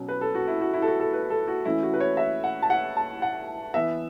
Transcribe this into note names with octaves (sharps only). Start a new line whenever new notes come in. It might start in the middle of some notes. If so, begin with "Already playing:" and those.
Already playing: B2 F#3 C#4
B4
A4
F#4
E4
F#4
E4
A4
F#4
A4
B4
A4
F#4
E3 A3 C#4 E4
F#4
B4
C#5
E5
F#5
A5
F#5
A5
F#5
E3 B3 E5